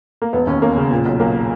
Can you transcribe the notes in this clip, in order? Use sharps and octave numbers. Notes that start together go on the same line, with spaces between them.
A#3
E1 B3
D#2 C#4
E1 A#3
C#3
A#2
B1
B1 A#3